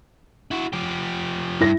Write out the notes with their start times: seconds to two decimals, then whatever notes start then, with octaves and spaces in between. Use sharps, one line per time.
0.51 E4 F#4
0.73 F3 G4
1.61 G2 E4 A#6